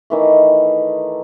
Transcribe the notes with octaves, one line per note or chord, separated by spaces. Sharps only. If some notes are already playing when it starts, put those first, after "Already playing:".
D#3 E3 A3